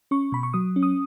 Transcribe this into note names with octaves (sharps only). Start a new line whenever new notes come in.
C#4 C#6
B2 B5
C#6
F#3 D#6
C#4
D#6